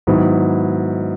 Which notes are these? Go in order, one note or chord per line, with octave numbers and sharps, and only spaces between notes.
G#2 D#3 F#3 B3 E4